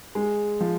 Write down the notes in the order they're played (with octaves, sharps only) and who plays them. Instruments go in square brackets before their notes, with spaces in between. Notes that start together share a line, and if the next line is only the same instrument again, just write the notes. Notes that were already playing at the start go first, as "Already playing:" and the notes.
[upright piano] G#3
F3